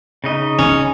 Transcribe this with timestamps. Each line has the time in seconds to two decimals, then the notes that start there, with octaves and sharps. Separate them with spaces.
0.24 C#3 D#4 D#5
0.59 C#4